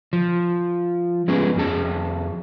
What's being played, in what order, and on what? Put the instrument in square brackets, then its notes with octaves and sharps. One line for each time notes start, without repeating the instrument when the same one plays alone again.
[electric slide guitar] F3
G#3 B3 C#4 G#4
F2 F#4 G#4 A5